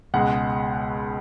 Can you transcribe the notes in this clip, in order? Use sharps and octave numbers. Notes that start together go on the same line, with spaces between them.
C#2 B2 G#3 F#5